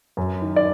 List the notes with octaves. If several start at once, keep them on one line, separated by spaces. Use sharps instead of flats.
F#2
D#3
D5